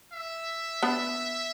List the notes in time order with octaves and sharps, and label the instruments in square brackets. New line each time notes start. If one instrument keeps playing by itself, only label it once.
[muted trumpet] E5
[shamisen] B3 D4